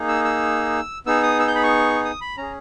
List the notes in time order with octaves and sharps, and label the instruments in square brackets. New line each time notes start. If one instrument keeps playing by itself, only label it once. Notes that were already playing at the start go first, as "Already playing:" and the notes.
Already playing: [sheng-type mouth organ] A#3 D#4 G#4
E6
E6
B3 D#4 G#4 E6
D#6
E6
G6
B5
C#6
D#6
B5
C#4 G#4 A#5